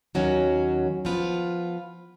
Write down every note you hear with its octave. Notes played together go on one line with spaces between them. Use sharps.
D#2 D#3 F#3 C#4 F#4
F3 B3 F4 B4